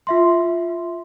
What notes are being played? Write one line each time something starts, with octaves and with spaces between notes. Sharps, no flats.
F4 E5 C6